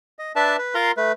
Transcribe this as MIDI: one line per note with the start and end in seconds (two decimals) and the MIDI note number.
0.19 0.32 75
0.36 0.57 62
0.36 0.57 71
0.36 0.57 74
0.36 0.57 76
0.36 0.57 81
0.58 0.74 71
0.75 0.92 65
0.75 0.92 70
0.75 0.92 77
0.75 0.92 82
0.75 0.92 84
0.97 1.12 57
0.97 1.12 71